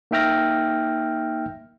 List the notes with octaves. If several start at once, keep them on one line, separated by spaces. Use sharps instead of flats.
A#3 D#4 E5 G5 F6 A#6